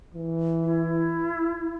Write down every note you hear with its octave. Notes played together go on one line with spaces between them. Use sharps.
E3
E4